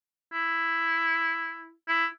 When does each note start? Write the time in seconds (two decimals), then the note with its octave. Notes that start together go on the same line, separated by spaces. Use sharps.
0.33 E4
1.88 E4